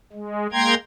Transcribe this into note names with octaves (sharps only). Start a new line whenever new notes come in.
G#3
G#3 A#3 G5 A#5 C6 G#6